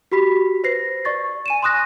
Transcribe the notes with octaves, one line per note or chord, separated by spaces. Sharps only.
F#4 G4 B5 B6
B4 C5 A#6 C7
D5 C#6 A6
G#5 D#7 E7
C6 C#6 D#6 F#6 A#6